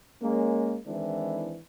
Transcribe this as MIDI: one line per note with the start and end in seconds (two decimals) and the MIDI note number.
0.22 0.76 56
0.22 0.76 58
0.22 0.76 61
0.87 1.57 51
0.87 1.57 52
0.87 1.57 56
0.87 1.57 60
0.87 1.57 62
0.87 1.57 64